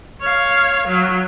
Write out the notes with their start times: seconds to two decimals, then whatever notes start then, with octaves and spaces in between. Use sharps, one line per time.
0.21 C#5 F5
0.87 F#3